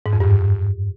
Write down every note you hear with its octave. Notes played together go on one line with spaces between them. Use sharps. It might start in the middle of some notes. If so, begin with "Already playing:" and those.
G#2
F2
G2